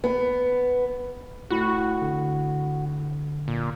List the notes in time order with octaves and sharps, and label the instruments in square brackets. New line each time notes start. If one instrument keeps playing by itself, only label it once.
[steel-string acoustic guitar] B3
[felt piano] A2 [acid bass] F#4 [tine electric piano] B5 F#6
[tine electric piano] D3
[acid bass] A#2